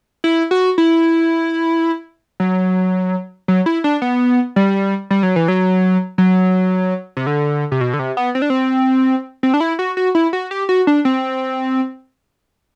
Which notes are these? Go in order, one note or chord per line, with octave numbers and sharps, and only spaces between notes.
E4
F#4
E4
F#3
F#3
E4
D4
B3
G3
G3
F#3
E3
F#3
F#3
C3
D3
C3
B2
D3
C3
B3
C4
D4
C4
C4
D4
E4
F#4
F#4
E4
F#4
G4
F#4
D4
C4